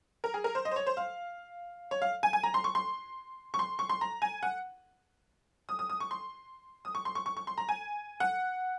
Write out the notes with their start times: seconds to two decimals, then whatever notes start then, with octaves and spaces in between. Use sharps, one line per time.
0.24 A#4
0.34 G#4
0.44 A#4
0.55 C5
0.65 D#5
0.71 C5
0.76 C#5
0.87 C5
0.97 F5
1.91 C#5
2.02 F5
2.23 G#5
2.33 G#5
2.43 A#5
2.54 C6
2.64 C#6
2.75 C6
3.54 C#6
3.59 C6
3.79 C#6
3.89 C6
4.01 A#5
4.22 G#5
4.43 F#5
5.69 D#6
5.79 D#6
5.89 D#6
6.00 C#6
6.11 C6
6.85 D#6
6.95 C#6
7.05 C6
7.15 C#6
7.26 C#6
7.37 C#6
7.47 C6
7.58 A#5
7.69 G#5
8.20 F#5